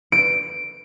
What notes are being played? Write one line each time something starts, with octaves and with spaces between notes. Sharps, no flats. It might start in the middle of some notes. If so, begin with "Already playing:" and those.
D7